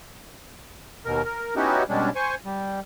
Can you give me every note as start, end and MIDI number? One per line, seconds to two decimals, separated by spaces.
1.05 1.22 39
1.05 1.22 47
1.05 1.22 70
1.25 1.54 70
1.56 1.83 59
1.56 1.83 61
1.56 1.83 63
1.56 1.83 64
1.56 1.83 66
1.56 1.83 67
1.89 2.10 47
1.89 2.10 55
1.89 2.10 56
1.89 2.10 61
1.89 2.10 62
2.16 2.35 72
2.16 2.35 80
2.16 2.35 85
2.45 2.80 55